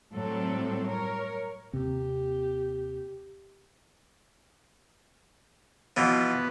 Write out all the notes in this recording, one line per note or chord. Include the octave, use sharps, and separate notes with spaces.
A2 F#3 G3 C4 A4
A#4 C#5
D#2 C3 C4 G4
B2 E3 F3 B3